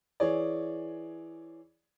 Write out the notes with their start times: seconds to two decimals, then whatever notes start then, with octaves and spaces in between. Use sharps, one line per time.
0.20 E3 G#4 C#5 D5